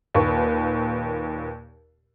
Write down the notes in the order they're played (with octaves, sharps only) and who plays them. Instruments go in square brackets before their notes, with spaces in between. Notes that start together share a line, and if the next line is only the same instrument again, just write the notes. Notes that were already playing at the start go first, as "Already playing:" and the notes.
[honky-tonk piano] D#2 A#2 B4 C#6